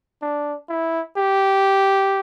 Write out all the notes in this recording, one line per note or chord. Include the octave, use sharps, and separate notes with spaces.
D4
E4
G4